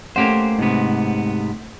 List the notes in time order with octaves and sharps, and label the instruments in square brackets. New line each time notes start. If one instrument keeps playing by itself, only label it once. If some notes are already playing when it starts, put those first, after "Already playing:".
[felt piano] A3 C#4 F#5 [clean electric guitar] A#3 G4 C5
[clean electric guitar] G#2 C3 B3